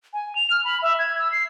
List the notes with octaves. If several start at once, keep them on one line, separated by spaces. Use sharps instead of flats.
G#5
F7
F6
B5
E5
G#6
E6
C7